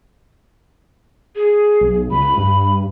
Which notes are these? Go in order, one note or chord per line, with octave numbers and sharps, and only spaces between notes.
G#4
B1
C#2 B5
G2